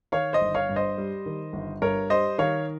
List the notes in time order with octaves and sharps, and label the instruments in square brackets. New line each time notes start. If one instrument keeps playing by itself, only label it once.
[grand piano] D#3 C#5 F5
C5 D#5
G1
C#5 F5
G2
C5 D#5
G3
D#3
G1
G2 A#4 C#5
G3 C5 D#5
D#3 C#5 F5